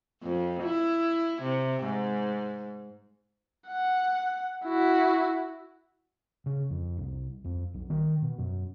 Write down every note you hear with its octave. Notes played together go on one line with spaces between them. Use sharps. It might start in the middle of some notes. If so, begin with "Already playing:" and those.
F2
E4
C3
G#2
F#5
E4 F#4
C#3
F2
C2
F2
B1
D#3
B2
F#2